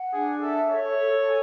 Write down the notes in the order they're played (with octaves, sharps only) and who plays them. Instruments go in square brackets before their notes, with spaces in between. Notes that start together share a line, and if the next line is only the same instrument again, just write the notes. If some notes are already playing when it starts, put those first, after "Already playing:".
Already playing: [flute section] F#5
[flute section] D4 [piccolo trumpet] G#4
[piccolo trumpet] A4 [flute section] E5
[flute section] A4 [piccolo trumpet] C#5
[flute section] A4
G#5